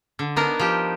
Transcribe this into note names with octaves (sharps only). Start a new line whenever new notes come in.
D3
B3 D4 D#4 A#4
F3 G4